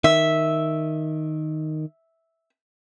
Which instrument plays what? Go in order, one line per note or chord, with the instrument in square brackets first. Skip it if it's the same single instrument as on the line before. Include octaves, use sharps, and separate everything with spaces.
[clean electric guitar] D#3 [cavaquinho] E5